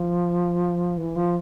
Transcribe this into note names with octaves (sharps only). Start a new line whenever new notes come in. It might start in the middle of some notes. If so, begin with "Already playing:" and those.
Already playing: F3
E3
F3